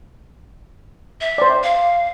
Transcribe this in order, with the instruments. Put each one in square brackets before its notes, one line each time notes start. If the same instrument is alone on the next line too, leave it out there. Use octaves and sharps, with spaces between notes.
[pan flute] E5
[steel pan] C5 D5
[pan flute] F5